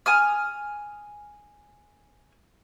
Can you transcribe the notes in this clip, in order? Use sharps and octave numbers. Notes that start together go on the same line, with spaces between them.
G#5 D#6 F6